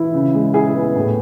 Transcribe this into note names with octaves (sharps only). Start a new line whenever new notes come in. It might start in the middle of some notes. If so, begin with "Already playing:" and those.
Already playing: E3 E4
C#3
G#3
E4 G#4 G#5
B3
A2